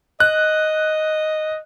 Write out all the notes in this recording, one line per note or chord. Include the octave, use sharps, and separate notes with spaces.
D#5 F#6